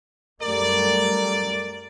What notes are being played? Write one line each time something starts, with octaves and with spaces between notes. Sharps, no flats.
F#2 G3 A3 A#4 D5